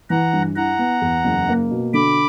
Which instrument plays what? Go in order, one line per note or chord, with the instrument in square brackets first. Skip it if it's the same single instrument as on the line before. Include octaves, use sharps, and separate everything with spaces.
[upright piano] E3 [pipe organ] F#5 A#5
[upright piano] G2
[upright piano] E4 [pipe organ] F#5 A#5
[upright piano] B3
E2
F#1
A#3
B2
[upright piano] D3 [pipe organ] B5 D6